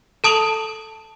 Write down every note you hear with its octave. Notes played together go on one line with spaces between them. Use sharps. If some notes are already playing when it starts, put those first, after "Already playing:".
A4 A5 D#6 F7 F#7